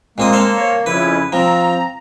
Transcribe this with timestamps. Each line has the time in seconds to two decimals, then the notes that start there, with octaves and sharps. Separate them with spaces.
0.18 A#2 G#3 A#3 C4 D#5
0.33 A4 C5 F5
0.56 A#4 C#5
0.86 F2 C#3 F3 C#4 E4 B4
1.33 F3 C4 A#5